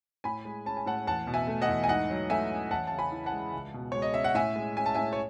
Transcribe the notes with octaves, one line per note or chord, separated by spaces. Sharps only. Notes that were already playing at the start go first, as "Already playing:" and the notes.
A2 G#5 B5
G#3
C#4 A5
G#5
A2 F#5 A5
E2 F#5 A5
B2
E5 G#5
A3
D#5 F#5
E2
G#5
G#2 D#5 F#5
F#3
A3 E5 G#5
C#4
E2 F#5 A5
C#3 A5
G#5 B5
E3
F#5 A5
G#3
C#2
B2
G#3 C#5
D#5
C#4 E5
F#5
A2 E5 G#5
G#3
C#4 G#5
A5
A2 E5 G#5
C#5